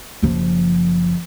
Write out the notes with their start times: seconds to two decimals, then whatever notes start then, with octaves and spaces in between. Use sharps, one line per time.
0.22 F#1 F3